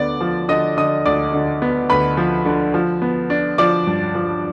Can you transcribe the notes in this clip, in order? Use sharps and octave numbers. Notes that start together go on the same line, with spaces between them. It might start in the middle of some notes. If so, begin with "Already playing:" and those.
Already playing: D2 D3 B3 D5 D6
F3
D3 D#5 D#6
D3 D#5 D#6
D2 D5 D6
D3
B3
D2 B4 B5
F3
D3
F3
B3
D4
F3 D5 D6
G2
F3